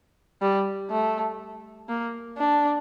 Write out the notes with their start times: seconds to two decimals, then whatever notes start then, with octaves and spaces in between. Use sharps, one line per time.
0.42 G3
0.90 A3
1.89 A#3
2.38 D4